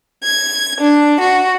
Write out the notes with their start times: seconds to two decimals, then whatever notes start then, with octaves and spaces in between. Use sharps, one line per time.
0.22 G#6
0.79 D4
1.20 F#4